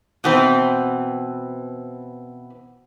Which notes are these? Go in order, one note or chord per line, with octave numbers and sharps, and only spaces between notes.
B2 E3 C4